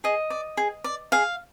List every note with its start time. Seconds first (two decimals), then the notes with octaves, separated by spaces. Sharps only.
0.04 G#4 D#5
0.30 D5
0.57 G#4
0.84 D5
1.12 G#4 F5